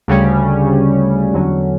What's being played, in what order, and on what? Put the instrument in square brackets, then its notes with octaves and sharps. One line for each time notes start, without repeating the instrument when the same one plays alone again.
[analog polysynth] D2 C#3 G3 C#4
E2 D3 F#3 C#4